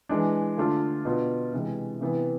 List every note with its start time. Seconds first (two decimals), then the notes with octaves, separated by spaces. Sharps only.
0.09 E3 G#3 D4
0.57 D3 A3 D4 F4
1.05 B2 B3 D4 F4
1.53 C3 E3 G#3
2.01 C3 E3 B3 E4